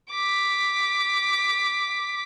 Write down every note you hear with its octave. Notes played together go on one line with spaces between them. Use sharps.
D6 B6